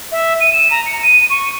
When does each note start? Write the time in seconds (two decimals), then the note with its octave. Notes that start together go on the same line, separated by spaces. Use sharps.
0.12 E5
0.40 D#7
0.53 E7
0.71 A#5
0.86 C#7
1.03 D#7
1.30 C#6